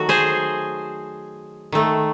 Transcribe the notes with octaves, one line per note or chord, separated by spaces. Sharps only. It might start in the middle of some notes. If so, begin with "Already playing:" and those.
Already playing: D#3 F#3 A3 F#4
G#4 C5
D#3 A3